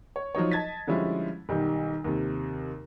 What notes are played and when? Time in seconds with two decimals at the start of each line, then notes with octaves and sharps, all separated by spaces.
0.16 C#5
0.35 F3 F#3 D#4 C#5
0.51 D#5 A5 G#6 A6 B6
0.87 D3 F3 G3 G#3 C#4 E4
1.49 B1 D#3 G3
2.04 D#2 C3